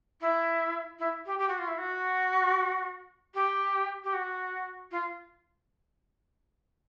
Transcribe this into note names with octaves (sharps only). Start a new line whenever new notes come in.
E4
E4
G4
G4
F#4
F4
E4
F#4
G4
G4
F#4
F4